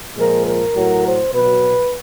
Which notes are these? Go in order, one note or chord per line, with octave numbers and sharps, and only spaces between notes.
A#2 F3 G#3 A#4
A#4
A2 F#3
C5
B2 F#3 B4